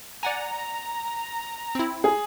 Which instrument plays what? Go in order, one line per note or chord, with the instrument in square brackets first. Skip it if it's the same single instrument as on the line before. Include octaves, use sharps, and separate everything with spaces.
[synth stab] D5 F#5 G#5 [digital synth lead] A#5
[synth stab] C4 E4
[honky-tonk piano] G#4